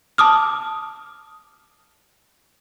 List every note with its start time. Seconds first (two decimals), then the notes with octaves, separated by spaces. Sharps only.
0.18 A5 D6 D#6 F6